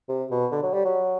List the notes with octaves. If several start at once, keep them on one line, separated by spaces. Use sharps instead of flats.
C3
B2
D3
F#3
G3
F#3